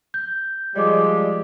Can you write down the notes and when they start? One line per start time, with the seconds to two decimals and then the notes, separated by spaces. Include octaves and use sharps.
0.14 G6
0.76 F3 G3 G#3 D5 D#5 D6